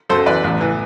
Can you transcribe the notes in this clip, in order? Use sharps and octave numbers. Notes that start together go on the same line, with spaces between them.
F#2 A4 C5
E3 B4 D5
A1
E3